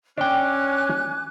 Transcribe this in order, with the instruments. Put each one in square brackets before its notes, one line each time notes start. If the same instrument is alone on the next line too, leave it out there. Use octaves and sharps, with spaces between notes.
[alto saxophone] C#4 [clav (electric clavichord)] D4 G5 [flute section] G#5 D6 F#6